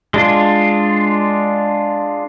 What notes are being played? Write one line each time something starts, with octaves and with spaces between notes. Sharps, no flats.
G#3 D4 F4